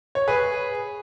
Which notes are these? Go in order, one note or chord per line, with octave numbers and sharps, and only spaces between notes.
C#5
G#4 B4